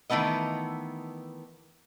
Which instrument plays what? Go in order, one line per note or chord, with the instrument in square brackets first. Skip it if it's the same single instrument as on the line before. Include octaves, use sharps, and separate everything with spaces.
[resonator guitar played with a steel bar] D#3 E3 A3 B3 D#5